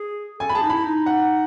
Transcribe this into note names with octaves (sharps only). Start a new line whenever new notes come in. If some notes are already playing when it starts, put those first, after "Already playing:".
Already playing: G#4
A4 G#5
B5
G#4 A5
D#4
E4 B5
D#4
F#5